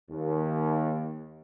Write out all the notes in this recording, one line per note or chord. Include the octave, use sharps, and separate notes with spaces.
D#2